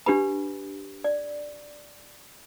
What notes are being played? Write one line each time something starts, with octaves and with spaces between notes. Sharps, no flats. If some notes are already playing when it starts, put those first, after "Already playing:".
D4 G4 B4 B5
D5